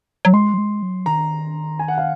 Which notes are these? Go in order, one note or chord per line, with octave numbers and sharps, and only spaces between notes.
F#3
G#3 C6
F#3
G#3
F#3
D#3 A#5
G#5
F#5
F5